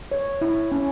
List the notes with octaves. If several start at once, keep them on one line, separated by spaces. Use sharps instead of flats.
C#5
E4
C#4